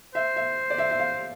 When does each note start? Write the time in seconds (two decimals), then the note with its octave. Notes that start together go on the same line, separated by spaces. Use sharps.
0.15 C5 E5
0.36 E5
0.70 D5
0.78 E5
0.91 E5
1.00 F5